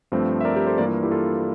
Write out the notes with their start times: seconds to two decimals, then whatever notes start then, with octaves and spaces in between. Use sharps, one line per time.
0.12 G2 F3 A3 C4
0.41 E5
0.45 A#4 D5
0.56 G4 A#4
0.67 A4 C5
0.78 G2 E3 A#3 A#4 D5
0.86 F4
1.03 E4 G4
1.11 F4 A4